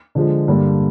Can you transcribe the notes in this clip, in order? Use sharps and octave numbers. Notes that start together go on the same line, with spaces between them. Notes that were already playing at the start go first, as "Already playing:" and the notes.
D3 F3 G#3
G2 D3 G3 A#3 D4